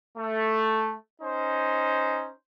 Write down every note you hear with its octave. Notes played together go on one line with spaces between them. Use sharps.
A3
C#4 D#4 C5